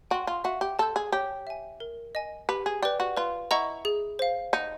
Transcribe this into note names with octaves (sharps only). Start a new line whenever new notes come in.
F#4 G5 C6
F4
F#4 E5
G4
A4 A5 C6 E6 G6
G#4
G4 C#5
E5 G#5
A#4
D#5 G#5
G4 B4
G#4
G4 B4 D5
F#4
F4 B4
E4 D#5 F#5 A#5 C#6
G#4
C5 F5
D#4 F#5